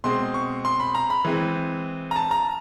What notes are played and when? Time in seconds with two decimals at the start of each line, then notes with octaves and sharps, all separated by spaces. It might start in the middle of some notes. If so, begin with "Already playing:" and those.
0.04 B2 G#3 C4 C6
0.34 C#6
0.65 C6
0.80 B5
0.95 A#5
1.10 B5
1.25 E3 G#3 C4
2.11 A#5
2.16 A5
2.31 A#5